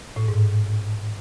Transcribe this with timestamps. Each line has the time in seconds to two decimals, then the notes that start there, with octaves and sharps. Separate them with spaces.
0.16 A2
0.28 G#2